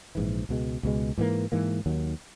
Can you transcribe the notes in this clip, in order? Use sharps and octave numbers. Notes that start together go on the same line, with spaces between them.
A#1 G#2 E3
C#2 B2 G#3
C#2 B2 G#3
G#2 E3 A#3
G#2 E3 A#3
D#2 D#3 F#3